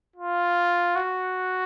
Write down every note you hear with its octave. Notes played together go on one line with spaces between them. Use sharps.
F4
F#4